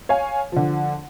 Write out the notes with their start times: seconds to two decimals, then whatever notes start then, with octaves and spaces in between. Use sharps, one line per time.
0.09 C#5 F5 G#5
0.52 D3 F3